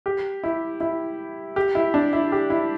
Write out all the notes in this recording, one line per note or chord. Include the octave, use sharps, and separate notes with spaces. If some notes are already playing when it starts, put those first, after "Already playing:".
G4
E4
E4
G4
E4
D4
E4
G4
E4